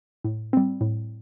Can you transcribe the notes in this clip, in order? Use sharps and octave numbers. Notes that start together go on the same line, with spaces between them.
A2
G3 C4
A2